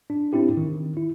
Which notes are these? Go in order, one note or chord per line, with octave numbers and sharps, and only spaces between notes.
D4
C4 D4 E4 G4
D#3
E4